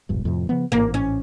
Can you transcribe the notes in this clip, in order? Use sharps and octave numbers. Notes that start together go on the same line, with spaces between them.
E1 A#1 G2
F2 A2 C3
C#3 F3 B3
A1 G#2 A#3
C#4